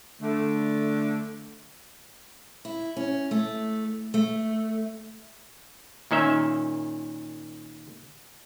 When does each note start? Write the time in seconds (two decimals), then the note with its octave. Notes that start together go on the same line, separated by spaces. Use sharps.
0.21 D3 A3
2.65 E4
2.97 C#4
3.31 A3
4.14 A3
6.11 A#2 D#3 C#4 E5